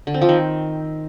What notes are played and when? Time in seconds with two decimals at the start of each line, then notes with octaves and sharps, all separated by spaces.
0.07 D3
0.14 C4
0.22 F3
0.29 D#3